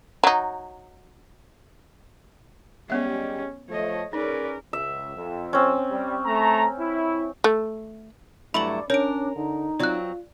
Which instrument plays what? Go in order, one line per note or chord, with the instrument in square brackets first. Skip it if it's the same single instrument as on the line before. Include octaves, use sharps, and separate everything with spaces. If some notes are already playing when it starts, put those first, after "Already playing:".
[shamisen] F#3 D#4
[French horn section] G3 G#3 G4 [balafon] B3 E5 [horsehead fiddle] C#4
[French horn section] F3 A3 [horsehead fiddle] C#5 D#5
[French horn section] C#4 G#4 A#4 [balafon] D#4 [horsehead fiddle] B4 D5
[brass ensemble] C#2 [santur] E5
[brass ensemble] F2
[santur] C4 C#4
[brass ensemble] G3
A3 A#5
E4
[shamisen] A3
[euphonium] G2 [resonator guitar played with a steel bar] F#3 A3 E4 [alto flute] D5 [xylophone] B5 F#7
[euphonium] C#4 [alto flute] D4 [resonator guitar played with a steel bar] A#4 [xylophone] C#5 D7
[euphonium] D3 [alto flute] D#4
[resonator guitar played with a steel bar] F#3 C4 [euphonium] F4 [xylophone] D5 F#6